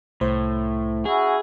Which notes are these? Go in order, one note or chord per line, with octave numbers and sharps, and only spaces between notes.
C2 A2 C5
C#4 E4 F#4 G#4